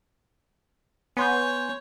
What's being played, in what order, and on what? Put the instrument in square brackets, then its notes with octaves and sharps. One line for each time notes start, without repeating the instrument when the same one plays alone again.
[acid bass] B3 [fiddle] C#5 [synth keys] G#5 C6 G6